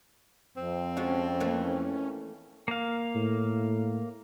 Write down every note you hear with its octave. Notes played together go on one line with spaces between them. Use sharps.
F2 C4
F3 G#3 C#4 F#4
E3 A3 A#3
A#3 F5
A2